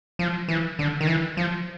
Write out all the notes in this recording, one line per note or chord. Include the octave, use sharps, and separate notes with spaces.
F3
E3
D3
D#3
E3
F3